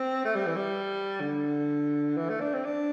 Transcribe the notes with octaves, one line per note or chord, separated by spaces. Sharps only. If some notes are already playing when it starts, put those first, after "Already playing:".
Already playing: C4
A3
G3
E3
G3
D3
E3
A3
D4
C4
D4